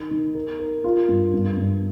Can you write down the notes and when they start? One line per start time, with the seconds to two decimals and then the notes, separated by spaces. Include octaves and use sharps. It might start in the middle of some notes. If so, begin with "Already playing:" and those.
Already playing: D#3
0.11 D#3
0.35 A#4
0.59 A#4
0.84 F4
1.08 G2
1.33 G2
1.57 G2